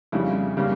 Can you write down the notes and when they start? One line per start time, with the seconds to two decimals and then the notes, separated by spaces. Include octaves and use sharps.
0.12 F2 C#3 G3 E4
0.57 C#3 G3 A#3